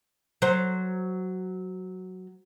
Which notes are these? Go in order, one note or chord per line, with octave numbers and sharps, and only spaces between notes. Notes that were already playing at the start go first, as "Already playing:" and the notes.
F#3 C5